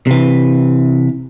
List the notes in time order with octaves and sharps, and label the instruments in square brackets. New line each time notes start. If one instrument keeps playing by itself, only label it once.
[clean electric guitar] C3 E3